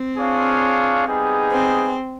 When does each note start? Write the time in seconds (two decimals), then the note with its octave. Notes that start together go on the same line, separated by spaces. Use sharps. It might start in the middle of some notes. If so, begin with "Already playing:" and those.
Already playing: C4
0.17 D4 F4 G#4 C#5 F5
1.07 G3 B3 D#4 G#4
1.52 C4